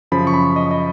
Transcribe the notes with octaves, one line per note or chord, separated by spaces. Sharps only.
F#2 C#3 F3 B5
C#6
B5
D#5
D#5